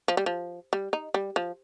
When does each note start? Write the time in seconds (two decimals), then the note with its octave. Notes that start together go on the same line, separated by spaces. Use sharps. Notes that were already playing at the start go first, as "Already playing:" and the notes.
0.08 F3
0.17 G3
0.26 F3
0.73 G3
0.93 D#4
1.14 G3
1.36 F3